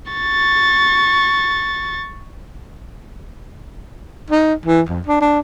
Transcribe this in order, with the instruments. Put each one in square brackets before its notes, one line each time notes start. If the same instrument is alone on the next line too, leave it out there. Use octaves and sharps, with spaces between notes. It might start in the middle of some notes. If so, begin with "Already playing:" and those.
[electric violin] C#6 A6
[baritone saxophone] D#4
E3
F2
D4
D4